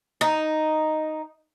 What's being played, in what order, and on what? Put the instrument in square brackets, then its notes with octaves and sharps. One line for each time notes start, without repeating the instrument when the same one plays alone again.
[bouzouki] D#4